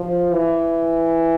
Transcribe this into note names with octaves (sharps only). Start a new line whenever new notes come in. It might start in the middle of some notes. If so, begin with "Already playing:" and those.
Already playing: F3
E3